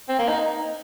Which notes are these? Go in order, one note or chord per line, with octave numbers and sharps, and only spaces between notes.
C4
A#3
D#4